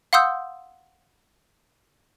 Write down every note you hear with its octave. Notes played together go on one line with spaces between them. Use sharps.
F5 F#5 C6 D#6 E6 G6